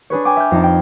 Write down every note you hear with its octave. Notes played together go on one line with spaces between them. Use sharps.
D4 G#4 B4 C#5
G5 G#5 D6
E5 F6 G6
F2 D#4 A5
G5